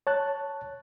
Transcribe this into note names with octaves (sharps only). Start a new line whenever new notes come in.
C#5 A5 F#6